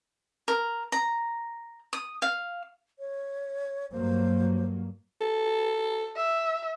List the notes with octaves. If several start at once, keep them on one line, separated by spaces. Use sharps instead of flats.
A#4
A#5
D#6
F5
C#5
G2 F#3 A#3 C5
A4
E5